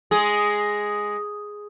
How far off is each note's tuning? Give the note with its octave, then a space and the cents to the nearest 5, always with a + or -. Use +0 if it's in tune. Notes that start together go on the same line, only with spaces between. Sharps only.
G#3 +0 G#4 +0